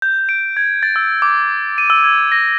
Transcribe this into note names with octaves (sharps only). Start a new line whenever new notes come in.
G6
D7
G#6
A6
E6
D6
D#7
E6
G#6
A#6